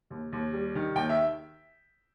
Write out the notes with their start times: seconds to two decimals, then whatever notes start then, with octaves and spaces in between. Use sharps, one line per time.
0.10 D#2
0.32 D#2
0.53 G3
0.75 D#3
0.96 D#2 G5
1.09 E5